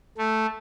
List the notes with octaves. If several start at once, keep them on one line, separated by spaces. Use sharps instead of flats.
A3